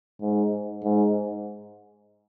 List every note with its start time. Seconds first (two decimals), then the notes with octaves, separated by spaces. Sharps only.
0.21 G#2
0.83 G#2